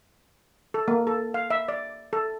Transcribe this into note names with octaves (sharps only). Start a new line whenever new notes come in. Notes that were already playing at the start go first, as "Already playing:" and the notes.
A4
A#3
A4
F5
E5
D5
A4